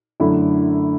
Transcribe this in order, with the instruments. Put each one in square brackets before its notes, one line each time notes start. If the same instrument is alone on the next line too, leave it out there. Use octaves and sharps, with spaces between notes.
[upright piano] F#2 D3 A3 E4